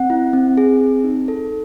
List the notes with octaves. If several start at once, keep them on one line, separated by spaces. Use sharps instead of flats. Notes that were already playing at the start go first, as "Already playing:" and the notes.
Already playing: C4 F#5
E4
C4
G#4
C4
D#4
A4